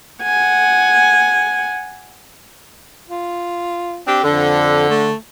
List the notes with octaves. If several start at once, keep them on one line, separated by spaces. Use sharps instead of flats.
F#5 G#5
F4
C4 D4 G4
F2 D3
A3